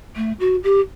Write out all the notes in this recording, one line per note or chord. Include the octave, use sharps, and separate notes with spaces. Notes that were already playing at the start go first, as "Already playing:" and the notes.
A3
F#4
G4